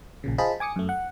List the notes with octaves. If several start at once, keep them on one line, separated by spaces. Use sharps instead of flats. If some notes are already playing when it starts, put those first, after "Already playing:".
A#1 A#2 C#3
F4 G#4 C5 D#5 A5 B5
G#5 D6 D#6 C#7
F#2 A3
F#5